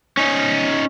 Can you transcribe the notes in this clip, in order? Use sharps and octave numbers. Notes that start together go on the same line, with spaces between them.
C#4 D#4